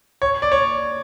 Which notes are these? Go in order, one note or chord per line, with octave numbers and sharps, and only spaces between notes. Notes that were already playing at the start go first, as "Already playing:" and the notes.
C#5
D5
C#5